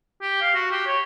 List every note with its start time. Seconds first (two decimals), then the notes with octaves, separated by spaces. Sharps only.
0.22 G4
0.42 F5
0.54 F#4
0.71 G4
0.86 C#5